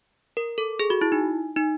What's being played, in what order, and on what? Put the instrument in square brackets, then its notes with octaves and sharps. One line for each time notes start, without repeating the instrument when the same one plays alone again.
[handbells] A#4
A4
G#4
F#4
E4
D#4
D#4